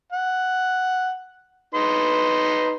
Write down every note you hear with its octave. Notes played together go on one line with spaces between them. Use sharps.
F#5
D#4 B4 C6